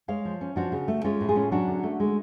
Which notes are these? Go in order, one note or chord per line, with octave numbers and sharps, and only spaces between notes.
G#3 C#5 F5
F3
C#4
F3 D4 F#4
C#3
A3
G#3 C#4 F4
A2
F4 G#4
C#4
F#3 D4 F#4
D3
A3
G#3